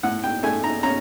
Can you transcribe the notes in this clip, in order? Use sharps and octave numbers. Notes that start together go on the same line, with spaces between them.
A2 F#5
G5
A3 G#5
A#5
C#4 A#5